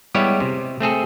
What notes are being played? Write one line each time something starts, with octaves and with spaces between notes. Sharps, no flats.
G3 G#3 B3 E4 G4 C#5
C3
A3 C4 G#4 A4